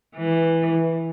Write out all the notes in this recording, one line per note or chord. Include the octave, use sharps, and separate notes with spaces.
E3